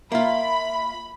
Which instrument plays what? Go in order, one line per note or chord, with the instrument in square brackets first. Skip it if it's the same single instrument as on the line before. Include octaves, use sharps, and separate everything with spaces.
[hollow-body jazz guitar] A#3 F4 [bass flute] E5 [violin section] B5